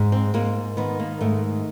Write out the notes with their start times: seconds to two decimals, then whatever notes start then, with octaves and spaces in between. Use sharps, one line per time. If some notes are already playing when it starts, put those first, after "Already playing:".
Already playing: G#2
0.12 C4
0.34 G#2 A#3
0.77 D#3 B3
1.00 A#3
1.21 G#2 A3